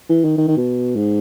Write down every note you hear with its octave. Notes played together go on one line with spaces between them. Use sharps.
E3
D#3
D#3
D#3
B2
G#2